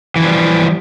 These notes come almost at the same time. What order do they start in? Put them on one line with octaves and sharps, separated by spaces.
E3 F3 G3